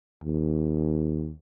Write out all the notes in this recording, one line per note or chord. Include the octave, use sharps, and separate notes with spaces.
D#2